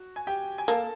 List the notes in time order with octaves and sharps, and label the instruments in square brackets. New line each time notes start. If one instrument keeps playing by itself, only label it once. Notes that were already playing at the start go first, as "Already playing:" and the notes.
Already playing: [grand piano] F#4
G#5
G4 G5
G#5
[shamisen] A#3 [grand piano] A4 A5